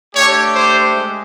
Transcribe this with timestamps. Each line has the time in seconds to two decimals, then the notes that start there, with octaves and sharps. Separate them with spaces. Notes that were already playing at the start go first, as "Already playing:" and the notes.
0.14 A3 D4 G4 C#5
0.54 C5
0.94 G#3